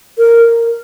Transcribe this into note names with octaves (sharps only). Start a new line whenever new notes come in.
A#4